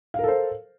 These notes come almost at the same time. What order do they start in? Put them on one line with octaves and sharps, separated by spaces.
F5 A#4 A4 C5